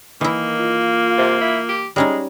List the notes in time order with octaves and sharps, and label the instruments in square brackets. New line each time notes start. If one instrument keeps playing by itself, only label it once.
[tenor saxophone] D#3 [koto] E3 E4 [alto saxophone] A#3
[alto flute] F4
[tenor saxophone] C3
E4
G4
[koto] G3 C#4 D#4 [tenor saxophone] G#3